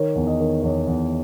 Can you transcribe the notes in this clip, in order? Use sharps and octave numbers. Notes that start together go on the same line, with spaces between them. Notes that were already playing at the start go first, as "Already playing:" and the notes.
Already playing: D#3 C#5
E2
D#5
D#3
E2 C#5
E2